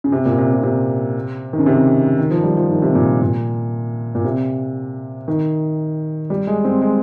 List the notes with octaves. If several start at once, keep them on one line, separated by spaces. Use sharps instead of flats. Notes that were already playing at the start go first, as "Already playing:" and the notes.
C#3
C3
A#2
C3
C3
C3
D#3
C#3
C3
D#3
F3
G3
F3
D#3
C3
A#2
A#2
A#2
C3
D#3
G3
G#3
C4
G#3